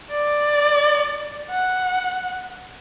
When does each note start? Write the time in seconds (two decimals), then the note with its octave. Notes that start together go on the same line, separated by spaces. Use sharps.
0.11 D5
1.51 F#5